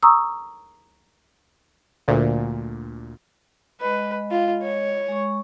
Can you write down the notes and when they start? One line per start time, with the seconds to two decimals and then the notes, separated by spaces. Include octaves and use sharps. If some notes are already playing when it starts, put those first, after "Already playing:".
0.03 A#5 C#6 D#6 E6
2.08 D2 A#2
3.81 G#3 B4 D#5
4.31 F4
4.63 C#5
5.08 G#3 C#6